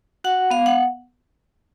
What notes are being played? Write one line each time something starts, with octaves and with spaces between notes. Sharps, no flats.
F#4 F#5
B3 F5
F#5